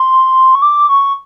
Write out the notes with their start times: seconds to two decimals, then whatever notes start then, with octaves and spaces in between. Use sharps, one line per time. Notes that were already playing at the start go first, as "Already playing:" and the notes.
Already playing: C6
0.55 C#6
0.62 D6
0.89 C#6